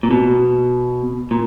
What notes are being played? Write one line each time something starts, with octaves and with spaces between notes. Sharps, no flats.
A#2
B2
A#2